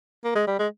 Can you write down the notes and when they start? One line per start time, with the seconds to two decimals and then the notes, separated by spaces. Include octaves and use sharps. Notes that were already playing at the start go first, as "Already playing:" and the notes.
0.24 A#3
0.35 G#3
0.47 G3
0.59 G#3